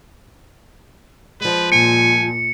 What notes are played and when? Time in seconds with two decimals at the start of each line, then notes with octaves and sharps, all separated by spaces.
1.41 F3 G#3 B4
1.72 A#2 G#5 C#7